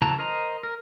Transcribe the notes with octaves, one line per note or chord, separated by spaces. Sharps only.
C#3 E3 F#3 A5 A#5
A#4 C5 D#5 A#5
A#4